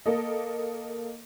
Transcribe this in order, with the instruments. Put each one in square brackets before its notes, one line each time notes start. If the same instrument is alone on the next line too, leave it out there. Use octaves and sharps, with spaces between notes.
[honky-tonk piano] A#3 A4 D#5